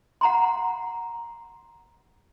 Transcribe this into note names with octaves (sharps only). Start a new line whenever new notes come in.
F#5 A#5 C6